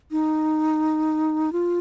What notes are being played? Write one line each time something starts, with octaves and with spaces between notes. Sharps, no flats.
D#4
F4